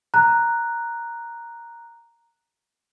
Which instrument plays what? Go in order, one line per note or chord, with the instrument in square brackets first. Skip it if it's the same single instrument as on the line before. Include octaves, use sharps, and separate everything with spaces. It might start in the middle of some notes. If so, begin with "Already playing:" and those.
[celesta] A#5 F#6